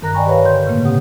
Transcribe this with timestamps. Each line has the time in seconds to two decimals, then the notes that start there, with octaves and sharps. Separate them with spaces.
0.02 G2 D#3 A#4 A#5 F#6 A#6
0.14 D5 D#5 G5 G#5 B5 C#6
0.26 G4 B4 C#5 F5
0.45 D3 C6 G6
0.66 A2 C#3 A3 A#3
0.85 B2 C4 G4 F#5 D#6